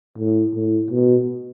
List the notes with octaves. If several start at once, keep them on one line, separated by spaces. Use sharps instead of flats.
A2
A2
B2